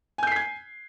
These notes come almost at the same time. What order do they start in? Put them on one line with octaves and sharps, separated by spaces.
G#5 G6 C7 B6 G#6